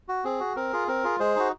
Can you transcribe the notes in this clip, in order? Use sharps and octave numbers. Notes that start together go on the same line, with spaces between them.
F#4
C4 G#4
F#4
C4 A#4
F4 G#4
C4 A#4
F4 G#4
G#3 G#4 C5
D#4 F#4